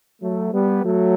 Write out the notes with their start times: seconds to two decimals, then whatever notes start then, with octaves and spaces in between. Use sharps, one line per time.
0.22 F#3 A3
0.53 G3 B3
0.84 F#3 A3